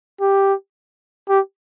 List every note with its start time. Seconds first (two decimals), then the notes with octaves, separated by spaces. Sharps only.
0.21 G4
1.29 G4